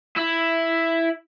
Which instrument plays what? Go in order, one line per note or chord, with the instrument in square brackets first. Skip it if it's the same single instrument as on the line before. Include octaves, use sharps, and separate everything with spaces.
[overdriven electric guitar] E4